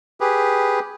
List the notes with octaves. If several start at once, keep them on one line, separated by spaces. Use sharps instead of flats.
G4 G#4 B4